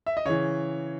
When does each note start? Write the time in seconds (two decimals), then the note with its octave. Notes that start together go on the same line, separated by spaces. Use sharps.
0.07 E5
0.17 D#5
0.25 C#3 E3 C#5